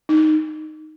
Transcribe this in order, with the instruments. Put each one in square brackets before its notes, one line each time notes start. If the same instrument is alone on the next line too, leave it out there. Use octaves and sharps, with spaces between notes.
[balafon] D#4